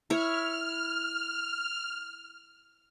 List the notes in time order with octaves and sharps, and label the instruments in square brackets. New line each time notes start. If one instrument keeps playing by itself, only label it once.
[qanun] E4 C#5 [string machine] F6